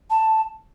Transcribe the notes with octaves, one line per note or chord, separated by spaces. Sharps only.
A5